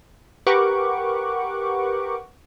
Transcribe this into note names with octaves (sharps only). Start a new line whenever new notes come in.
G4 A#4 B4 F#5 C#6 D6